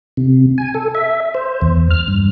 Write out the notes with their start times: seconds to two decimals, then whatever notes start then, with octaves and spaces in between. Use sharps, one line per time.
0.17 C3
0.58 G#5
0.74 A4
0.95 E5
1.34 C5
1.62 E2
1.91 F6
2.08 G2